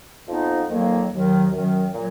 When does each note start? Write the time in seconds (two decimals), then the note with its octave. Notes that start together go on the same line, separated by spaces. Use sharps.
0.28 F2 F3 B3 D#4
0.69 F2 D#3 F#3 A#3
1.11 D#2 D#3 F#3
1.52 F#2 D#3 F#3
1.93 A#2 F#3